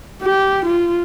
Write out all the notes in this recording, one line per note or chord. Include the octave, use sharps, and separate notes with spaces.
G4
F4